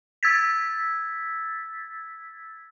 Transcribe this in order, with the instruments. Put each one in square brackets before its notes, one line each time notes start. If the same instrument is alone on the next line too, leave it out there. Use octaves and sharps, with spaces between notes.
[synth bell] E6 G#6 A6 B6